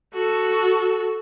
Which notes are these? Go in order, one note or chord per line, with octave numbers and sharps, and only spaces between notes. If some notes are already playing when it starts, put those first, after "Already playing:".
F#4 A4